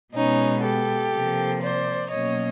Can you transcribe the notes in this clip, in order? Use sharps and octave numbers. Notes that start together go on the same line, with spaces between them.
B2 G#3 B3 C#4 D#4
G4 A4
C3 F3 A#3
C5 D5
B2 F#3 A#3 C#4 C#5 D#5